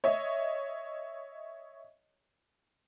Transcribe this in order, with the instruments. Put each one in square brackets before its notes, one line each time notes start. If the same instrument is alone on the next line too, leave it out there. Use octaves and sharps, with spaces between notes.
[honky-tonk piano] C#5 D#5 E5